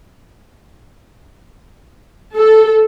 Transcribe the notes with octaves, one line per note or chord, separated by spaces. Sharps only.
A4